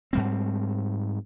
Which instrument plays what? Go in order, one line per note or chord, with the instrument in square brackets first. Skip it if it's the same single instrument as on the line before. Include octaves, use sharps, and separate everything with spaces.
[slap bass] G#2 G3 C4